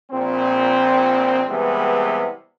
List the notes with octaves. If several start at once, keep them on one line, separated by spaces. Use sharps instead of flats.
A#1 A#2 C4
C3 E3 G3 G#3 B3